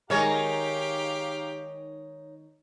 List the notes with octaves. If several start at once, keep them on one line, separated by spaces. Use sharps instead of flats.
D#3 G#3 D#4 G4 A#4 C#5 F5 A#5